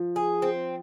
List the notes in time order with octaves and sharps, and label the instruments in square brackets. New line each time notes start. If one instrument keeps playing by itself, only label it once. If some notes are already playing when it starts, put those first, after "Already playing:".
Already playing: [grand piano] F3
[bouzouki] G#4
C4